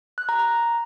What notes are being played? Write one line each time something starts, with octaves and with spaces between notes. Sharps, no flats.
F#6
A#5
A#5